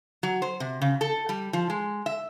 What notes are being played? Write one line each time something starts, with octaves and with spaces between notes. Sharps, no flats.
F#3
C5
C3
C#3
A4
G3
F3
G#3
E5